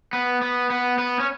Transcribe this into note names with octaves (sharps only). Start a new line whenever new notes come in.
B3
B3
B3
B3
C#4